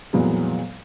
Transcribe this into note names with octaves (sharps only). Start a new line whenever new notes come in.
F2 A#2 E3 F#3 G#3 B3